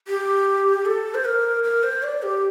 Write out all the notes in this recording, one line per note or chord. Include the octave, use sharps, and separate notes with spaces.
G4
A4
C5
A#4
A#4
C5
D5
G4